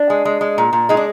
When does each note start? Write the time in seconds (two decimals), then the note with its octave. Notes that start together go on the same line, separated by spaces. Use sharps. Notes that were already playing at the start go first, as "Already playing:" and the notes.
Already playing: D4
0.10 G#3
0.25 G#3
0.41 G#3
0.58 A#2
0.73 A#2
0.89 G#3 D#4
0.97 D4